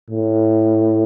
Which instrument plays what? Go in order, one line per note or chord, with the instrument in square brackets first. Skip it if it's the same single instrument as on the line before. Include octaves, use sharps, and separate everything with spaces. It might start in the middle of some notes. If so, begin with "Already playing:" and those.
[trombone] A2